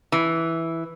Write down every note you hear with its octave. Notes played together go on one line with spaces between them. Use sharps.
E3